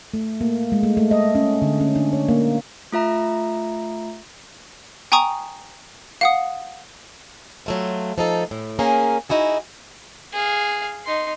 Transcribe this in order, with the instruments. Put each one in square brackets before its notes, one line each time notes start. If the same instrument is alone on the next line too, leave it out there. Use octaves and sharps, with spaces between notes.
[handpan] A3
A#3
G#3
A3
A3
D#5
C#4
D3
C#4
D4
C#5
A#3
[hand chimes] A3 F4 E5 A#5
[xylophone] G5 G#5 A#5 C#6 D#6
F5 F#5 D#6
[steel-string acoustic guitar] F#3 A3 F4
F3 D#4 A4
A2
A#3 C#4 G#4 A#4
D#4 E4 F#4 G#4
[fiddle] G#4 F5
D#4 C6